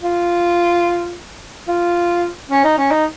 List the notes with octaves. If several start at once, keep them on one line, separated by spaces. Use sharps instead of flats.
F4
F4
C#4
D#4
C#4
D#4